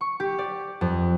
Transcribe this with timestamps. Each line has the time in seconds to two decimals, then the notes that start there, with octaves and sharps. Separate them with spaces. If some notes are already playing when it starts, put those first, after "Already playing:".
0.01 C#6
0.20 G4
0.38 D5
0.81 F2